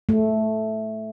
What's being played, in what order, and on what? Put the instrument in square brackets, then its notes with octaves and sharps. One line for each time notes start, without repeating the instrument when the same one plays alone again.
[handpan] A3